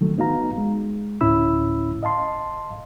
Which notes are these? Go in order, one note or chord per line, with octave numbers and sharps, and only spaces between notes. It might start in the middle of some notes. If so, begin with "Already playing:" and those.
D#3 F#3 A3
B3 D#4 F#4 F5 A#5
G#3
D2 A2 C#4 E4 B5 E6
D#5 F5 A5 C6